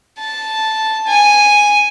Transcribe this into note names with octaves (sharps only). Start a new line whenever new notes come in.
A5
G#5